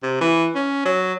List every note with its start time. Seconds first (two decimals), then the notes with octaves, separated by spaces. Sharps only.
0.03 C3
0.21 E3
0.55 C#4
0.85 F#3